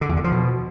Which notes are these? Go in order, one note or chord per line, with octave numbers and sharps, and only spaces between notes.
D3
E2
D3
F3
B2